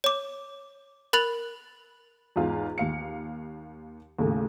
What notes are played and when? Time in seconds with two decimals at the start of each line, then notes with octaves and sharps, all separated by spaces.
0.04 C#5 D6
1.13 A#4 B5 F#6 A6 F7
2.36 E2 G#2 F4
2.78 D#2 F5 C#7
4.19 D#2 A2 C#3 A3